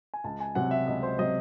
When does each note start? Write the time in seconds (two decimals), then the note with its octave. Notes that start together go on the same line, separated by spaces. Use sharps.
0.14 G#5
0.24 C#2 A5
0.40 G#5
0.55 C3 F#3 C4 F#5
0.71 E5
0.87 C#2 D#5
1.03 C5
1.18 C3 F#3 C4 D#5